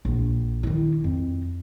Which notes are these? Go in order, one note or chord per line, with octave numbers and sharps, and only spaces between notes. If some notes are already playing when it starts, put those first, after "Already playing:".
A#1
D#3 E4
F2